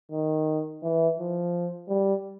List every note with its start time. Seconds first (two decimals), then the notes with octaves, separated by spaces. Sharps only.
0.12 D#3
0.83 E3
1.19 F3
1.89 G3